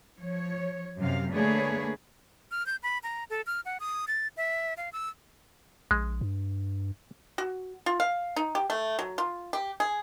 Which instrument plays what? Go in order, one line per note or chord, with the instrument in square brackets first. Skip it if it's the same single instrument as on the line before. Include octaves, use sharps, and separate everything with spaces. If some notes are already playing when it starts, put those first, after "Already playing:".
[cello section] F3 C#5
F#2 C3 F5
D3 A3 A#3 G#4 B4 C#5
[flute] F6
G6
B5
A#5
A4
F6
F#5
D#6
A6
E5
F5
E6
[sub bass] A#1 [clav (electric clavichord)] G#3
[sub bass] G2
[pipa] F#4
F4
F5
D#4
G4
A3
F#3
F4
G4
G#4